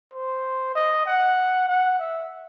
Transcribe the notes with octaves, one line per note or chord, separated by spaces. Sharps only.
C5
D#5
F#5
F#5
E5